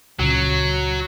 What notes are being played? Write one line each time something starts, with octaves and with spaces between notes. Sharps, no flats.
C#2 A#2 C#3 F#3